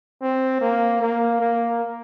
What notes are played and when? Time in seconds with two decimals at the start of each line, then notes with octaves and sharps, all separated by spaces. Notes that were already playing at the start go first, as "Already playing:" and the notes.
0.22 C4
0.61 A#3
1.01 A#3
1.40 A#3